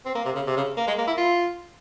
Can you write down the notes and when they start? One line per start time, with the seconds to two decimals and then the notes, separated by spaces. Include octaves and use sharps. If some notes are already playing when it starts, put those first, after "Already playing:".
0.05 C4
0.15 A#3
0.25 C3
0.36 C#3
0.47 C3
0.56 C#3
0.77 A#3
0.87 G#3
0.98 A#3
1.07 E4
1.17 F4